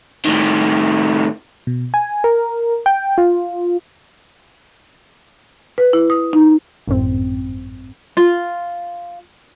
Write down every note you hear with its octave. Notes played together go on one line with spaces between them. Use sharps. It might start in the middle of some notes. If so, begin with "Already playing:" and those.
A2 D#3
B2
G#5
A#4
G5
F4
B4
E4
D#6
D#4
G#1 F#2 A2 C4
F4